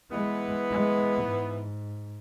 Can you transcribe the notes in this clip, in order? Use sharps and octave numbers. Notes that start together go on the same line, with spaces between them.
E3 G#3 B3
G#3
G#2